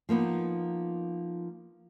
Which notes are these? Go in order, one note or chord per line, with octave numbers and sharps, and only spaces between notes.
F3 A#3 B3 D#4